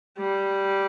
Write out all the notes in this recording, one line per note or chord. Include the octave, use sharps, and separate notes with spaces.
G3